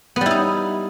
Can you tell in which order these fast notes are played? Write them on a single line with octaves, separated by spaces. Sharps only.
B3 G3 E4 D#4